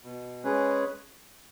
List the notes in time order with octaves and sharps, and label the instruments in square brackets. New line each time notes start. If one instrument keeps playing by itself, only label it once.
[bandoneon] B2
G#3 C#4 G#4 B4